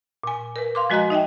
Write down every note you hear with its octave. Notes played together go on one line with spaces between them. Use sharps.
A#2 G#5
A#4 B4
F5 C6 D6
F3 G#3 F#4 D#5 A#5 F#6
D#4 D#5 E5 G5